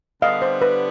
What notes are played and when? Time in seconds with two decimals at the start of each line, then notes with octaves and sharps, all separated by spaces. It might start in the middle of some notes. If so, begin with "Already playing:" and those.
0.22 D3 G3 B3 D#5 F5
0.42 C5
0.62 B4